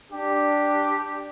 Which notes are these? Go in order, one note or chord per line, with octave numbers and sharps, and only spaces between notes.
D4 G4